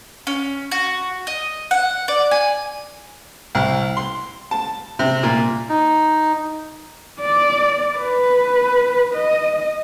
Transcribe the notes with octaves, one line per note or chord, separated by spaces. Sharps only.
C#4
F#4
D#5
F#5
D5
G#5
C2
C6
A5
C3
A#2
D#4
D5
B4
D#5